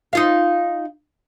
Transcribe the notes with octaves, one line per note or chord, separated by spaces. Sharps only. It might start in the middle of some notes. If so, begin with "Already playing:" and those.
D#4 F4 F5